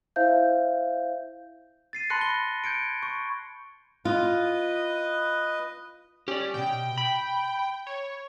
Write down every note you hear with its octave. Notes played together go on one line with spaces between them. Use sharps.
E4 C5 E5 F5 G6
A6 C7 D#7
A5 B5 C6 F#6 A#6 C#7
G7
G6 G#6 C#7 D7
C#6
F4 B4 D#5
C#4 G4 D5
D2 B2 G5
B5
C#5